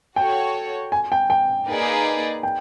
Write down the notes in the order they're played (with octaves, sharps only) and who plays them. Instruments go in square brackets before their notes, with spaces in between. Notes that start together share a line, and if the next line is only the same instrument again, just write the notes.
[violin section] F#4 A4 C#5 [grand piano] G5
[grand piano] G#5
G5
G5
[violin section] A#3 D#4 G#4 B4 D5
[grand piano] G5